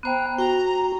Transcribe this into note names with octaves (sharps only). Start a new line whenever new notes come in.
B3 C5 G5 A#5 F#6
F#4 G5 A#5